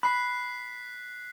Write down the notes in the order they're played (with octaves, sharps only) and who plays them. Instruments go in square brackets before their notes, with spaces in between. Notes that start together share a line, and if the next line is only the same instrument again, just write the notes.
[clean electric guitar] B5 [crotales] F#6 B6 C7